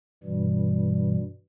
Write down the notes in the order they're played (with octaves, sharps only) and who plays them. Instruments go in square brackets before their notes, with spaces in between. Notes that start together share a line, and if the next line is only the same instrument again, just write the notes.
[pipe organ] G2 B2 E3 G3